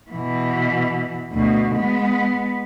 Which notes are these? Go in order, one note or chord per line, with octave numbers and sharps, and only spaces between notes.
B2 E3
D2 B2
G#3 B3